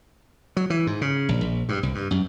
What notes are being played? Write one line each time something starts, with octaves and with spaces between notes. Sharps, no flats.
F#3
E3
G#2
C#3
A#1
A#1
G2
C2
G2
F#2